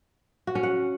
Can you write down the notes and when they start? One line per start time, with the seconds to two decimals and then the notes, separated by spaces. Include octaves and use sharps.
0.47 F#4
0.55 C#4
0.63 F#5